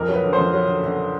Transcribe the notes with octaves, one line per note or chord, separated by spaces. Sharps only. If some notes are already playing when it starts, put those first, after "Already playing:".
Already playing: F2 A#4
F#3
B4
D3
C5
F2
F#3
D3
D3